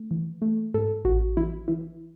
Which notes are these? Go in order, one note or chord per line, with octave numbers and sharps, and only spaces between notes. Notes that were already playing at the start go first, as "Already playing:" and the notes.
Already playing: A3
E3
A3
G#2 A4
A1 F#4
E3 E4
E3 E4